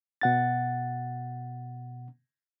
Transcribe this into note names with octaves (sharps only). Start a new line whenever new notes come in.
B2 F#5 A6